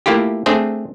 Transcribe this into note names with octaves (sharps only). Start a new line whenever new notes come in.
A3 A#3 E4 F4 G4
A3 C4 D4 G#4 C5